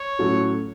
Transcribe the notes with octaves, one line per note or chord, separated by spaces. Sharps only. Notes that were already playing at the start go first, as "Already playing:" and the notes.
Already playing: C#5
A2 F#3 C#4 F#4 A4